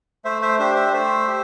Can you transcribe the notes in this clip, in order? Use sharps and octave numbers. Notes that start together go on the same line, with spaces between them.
A3 C5 E5
C5 E5
D4 G4 C5 E5
C5 E5
A3 C5 E5
G4